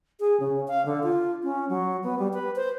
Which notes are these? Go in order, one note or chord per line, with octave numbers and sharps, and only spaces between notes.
G#4
C#3
F5
D3
F4
C#4
F#3
B3
G3
B4
C5